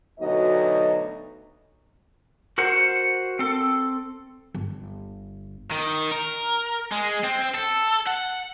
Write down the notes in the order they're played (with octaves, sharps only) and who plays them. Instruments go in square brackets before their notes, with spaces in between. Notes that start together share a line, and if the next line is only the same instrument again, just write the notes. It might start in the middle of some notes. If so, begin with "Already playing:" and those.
[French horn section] D2 B2 F#3 D#4 D#5
[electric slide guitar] F#4 A#4 C5 F#5
C4 A4
[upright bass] G1
[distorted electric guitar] D#3
A#4
G#3
C4
A4
F#5